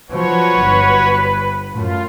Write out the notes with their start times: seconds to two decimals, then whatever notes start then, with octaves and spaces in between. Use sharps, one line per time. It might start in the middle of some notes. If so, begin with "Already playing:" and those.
0.10 F3 F#3 F#4 B4 C#5
0.58 G1
1.74 F#2 A2 F4